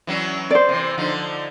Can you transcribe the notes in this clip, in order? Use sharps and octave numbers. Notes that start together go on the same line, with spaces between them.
E3 F#3 C#4
C5 D5
C3 E3
D3 F3 D#4